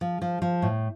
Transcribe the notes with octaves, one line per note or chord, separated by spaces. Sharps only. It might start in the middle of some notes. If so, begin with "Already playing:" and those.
F3
F3
F3
A2